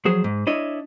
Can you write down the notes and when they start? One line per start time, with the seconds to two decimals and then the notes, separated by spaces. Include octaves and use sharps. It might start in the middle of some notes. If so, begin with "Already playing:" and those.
0.05 F3 F#3 G#4 C5
0.24 G#2
0.47 D4 E4 C#5 D#5